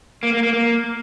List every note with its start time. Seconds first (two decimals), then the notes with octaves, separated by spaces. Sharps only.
0.23 A#3
0.33 A#3
0.43 A#3
0.53 A#3